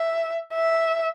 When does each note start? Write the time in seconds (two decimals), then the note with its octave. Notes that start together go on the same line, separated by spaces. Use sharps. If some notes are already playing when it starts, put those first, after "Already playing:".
Already playing: E5
0.54 E5